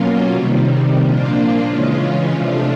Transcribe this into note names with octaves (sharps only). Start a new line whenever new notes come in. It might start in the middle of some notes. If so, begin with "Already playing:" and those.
Already playing: B2 F#3 A#3 C#4 F4
C3 D#3 G3
A#2 F3 A#3 D4 F4
C#3 E3 G#3 C#4 F4
C3 F3 A3 D4 F4